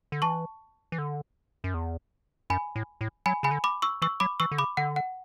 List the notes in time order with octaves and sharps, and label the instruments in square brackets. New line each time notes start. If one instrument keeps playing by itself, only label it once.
[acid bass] D3
[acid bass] E3 [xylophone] A5 C#6
[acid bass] E3
D3
F#2
E2
[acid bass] F#2 [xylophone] G#5 B5
[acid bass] A2
A2
[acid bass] F#3 [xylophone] G#5 B5
[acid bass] C#3 [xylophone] G#5 B5
[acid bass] D3
[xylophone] B5 D6
C#6 E6
[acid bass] E3 [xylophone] C#6 E6
[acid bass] F#3 [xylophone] B5 D6
[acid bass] E3 [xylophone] C#6 E6
[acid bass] D3
[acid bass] C#3 [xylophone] B5 D6
[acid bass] D3 [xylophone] F#5
[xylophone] F#5